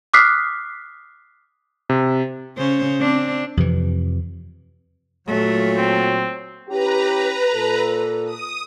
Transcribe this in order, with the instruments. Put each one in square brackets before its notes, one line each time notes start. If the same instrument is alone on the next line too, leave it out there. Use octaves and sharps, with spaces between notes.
[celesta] D6 D#6 F6 F#6 B6 C7
[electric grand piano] C3
[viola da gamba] C#3 C#4 C5
C4 D4
[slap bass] F2 C3 E3
[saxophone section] A#2 F#3 [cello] A3
[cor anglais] C4
[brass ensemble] C#4 E4 G4 [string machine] B4 A#5
[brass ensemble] A#2 A4
[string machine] D#6